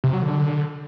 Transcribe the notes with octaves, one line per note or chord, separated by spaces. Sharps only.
C3
F#3
D3